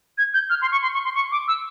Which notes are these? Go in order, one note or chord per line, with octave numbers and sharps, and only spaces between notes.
G#6
G6
F6
C6
C#6
C6
C#6
C6
C#6
D6
E6